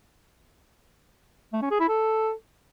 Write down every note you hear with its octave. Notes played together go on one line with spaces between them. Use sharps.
A3
C#4
G#4
E4
A4